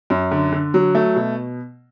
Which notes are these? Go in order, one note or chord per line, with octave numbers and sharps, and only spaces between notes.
F#2
D3
D3
F#3
A3
B2